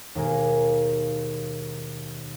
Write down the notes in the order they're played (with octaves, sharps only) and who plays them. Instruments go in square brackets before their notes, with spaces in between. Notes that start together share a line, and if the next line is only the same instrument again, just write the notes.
[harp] D#2 B2 G#3 A#4 F5 G#5